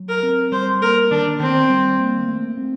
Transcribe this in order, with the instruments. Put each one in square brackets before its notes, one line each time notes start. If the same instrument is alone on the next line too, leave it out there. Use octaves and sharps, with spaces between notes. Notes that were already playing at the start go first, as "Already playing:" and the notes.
Already playing: [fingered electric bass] F#3
[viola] A#4
[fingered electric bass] C4
[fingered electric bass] G3 [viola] C5
[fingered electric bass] A#3 [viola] A#4
[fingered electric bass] D#3 [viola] D4
[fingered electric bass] D#3 [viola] C4
[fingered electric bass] G3
A#3
A3
C4